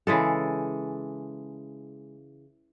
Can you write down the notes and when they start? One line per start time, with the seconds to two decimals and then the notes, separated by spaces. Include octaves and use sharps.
0.07 C#3 E3 G#3 A4